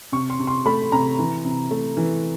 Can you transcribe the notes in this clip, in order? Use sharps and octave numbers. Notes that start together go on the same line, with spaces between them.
C3 C#6
C6
C3
C6
A3 B5
C3 A#5
E3
C3
A3
E3